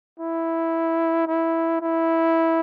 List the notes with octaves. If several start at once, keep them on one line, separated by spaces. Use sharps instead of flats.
E4
E4
E4